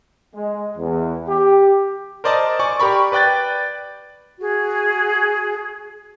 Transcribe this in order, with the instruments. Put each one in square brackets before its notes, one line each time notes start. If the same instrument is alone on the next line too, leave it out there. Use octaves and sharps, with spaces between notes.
[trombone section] G#3
E2
G4
[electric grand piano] A#4 C5 D5 D#5 A5
D5 G#5 C#6
G4 A#4 B5 C#6
B4 D5 G5 F#6 A6
[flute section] F#4 G#4